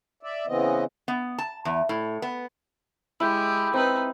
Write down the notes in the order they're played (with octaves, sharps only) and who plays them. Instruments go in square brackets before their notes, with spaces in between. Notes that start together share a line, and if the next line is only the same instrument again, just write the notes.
[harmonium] D5 E5
C#3 E3 B3 C4 D#5
[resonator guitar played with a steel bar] B3
A5
E2
A2
B3
[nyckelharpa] G#3 G4 [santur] E4
[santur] C4 [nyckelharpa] D#4 B4